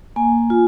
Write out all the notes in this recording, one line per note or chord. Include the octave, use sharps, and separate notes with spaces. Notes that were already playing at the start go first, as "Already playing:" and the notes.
A#3 G#5
F4